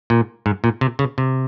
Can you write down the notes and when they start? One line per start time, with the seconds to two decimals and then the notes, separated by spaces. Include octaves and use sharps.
0.10 A#2
0.46 G#2
0.64 A#2
0.81 C3
0.99 C#3
1.18 C3